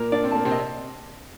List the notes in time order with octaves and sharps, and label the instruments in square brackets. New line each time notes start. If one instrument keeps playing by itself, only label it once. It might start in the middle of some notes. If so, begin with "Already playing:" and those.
Already playing: [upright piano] A#2 A#3 [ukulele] A#4
[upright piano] D4 [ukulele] D5
[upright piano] C4
[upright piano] A#3 [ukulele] A5
[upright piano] C3 C4
[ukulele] D#5